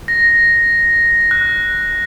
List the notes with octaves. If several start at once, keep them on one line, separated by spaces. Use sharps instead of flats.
A#6
F#6